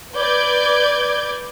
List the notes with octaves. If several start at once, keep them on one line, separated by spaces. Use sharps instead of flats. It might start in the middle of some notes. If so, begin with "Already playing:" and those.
B4 D5 D6 G6 G#6